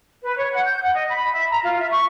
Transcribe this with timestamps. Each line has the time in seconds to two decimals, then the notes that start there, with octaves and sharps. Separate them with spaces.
0.24 B4
0.36 C#5
0.52 F#5
0.64 G6
0.82 F#5
0.94 D#5
1.09 B5
1.33 E5
1.50 A#5
1.64 F4
1.78 E5
1.91 C#6